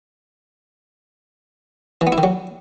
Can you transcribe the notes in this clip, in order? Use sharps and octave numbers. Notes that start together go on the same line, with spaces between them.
E3
B3
E4
D#3
F#3